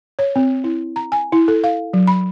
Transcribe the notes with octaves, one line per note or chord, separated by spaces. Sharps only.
C#5
C4
E4
A#5
G#5
E4
A4
F5
F#3
B5